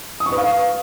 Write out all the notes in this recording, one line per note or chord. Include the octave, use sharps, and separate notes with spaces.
D#6
C#6
B4
F5